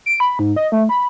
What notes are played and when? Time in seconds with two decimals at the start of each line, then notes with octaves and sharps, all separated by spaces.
0.06 D7
0.20 B5
0.39 G#2
0.56 D#5
0.72 A3
0.89 B5